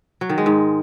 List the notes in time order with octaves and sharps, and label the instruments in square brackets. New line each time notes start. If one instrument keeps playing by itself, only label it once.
[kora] F#3
D#3
G#3
G#2